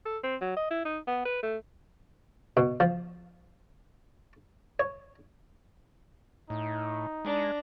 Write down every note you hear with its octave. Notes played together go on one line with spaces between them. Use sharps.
A4
C4
F#3
D#5
E4
D#4
B3
B4
A3
B2
F3
C#5
A2 D#4
G#3 D4 A#5